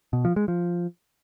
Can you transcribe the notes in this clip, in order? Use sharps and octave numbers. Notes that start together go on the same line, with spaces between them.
B2
F3
G#3
F3